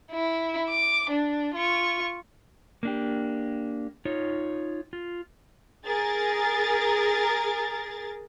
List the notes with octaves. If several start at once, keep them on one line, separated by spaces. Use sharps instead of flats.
E4
D6
D4
F4 C#6
A#3 D4 G4
D#4 F4 C#5
F4
G#4 A#4 A6